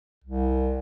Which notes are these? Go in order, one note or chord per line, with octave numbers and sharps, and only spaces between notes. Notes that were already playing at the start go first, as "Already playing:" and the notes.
C2